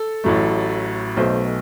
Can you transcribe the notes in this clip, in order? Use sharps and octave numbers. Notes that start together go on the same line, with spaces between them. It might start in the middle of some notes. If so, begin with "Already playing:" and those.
Already playing: A4
A1 A2 F#3 A3
B1 B2 A3 C5